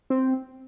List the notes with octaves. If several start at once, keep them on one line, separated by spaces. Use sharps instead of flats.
C4